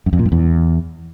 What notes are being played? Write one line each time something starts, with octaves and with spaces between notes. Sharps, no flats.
F#2
F2
A#2
G2
E2